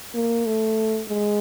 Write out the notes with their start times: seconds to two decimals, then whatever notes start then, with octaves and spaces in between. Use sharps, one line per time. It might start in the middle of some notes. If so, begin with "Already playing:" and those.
0.15 A#3
0.46 A3
1.09 G#3